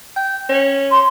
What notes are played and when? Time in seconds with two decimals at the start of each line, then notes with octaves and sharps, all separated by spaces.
0.16 G5
0.49 C#4
0.92 C6